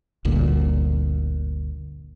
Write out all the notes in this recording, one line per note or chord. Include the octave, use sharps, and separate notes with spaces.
G1 D2 A#2